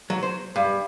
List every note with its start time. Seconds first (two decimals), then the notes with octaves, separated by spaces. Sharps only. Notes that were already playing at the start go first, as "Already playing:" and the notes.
0.10 F#3
0.23 C5
0.56 G2